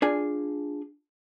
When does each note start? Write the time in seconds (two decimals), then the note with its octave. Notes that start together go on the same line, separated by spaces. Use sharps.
0.02 D4 F4 G#4 G#5